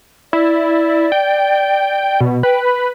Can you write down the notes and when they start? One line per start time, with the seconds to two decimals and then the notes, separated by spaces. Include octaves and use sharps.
0.33 E4 D5
1.12 G5
2.21 B2
2.43 B4 G5
2.64 B5